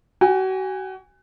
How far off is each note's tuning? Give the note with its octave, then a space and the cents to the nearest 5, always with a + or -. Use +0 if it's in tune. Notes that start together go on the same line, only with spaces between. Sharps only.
F#4 +35 G#5 -25